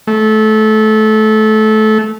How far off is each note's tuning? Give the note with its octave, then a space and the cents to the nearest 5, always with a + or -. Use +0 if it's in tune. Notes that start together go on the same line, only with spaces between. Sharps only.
A3 -20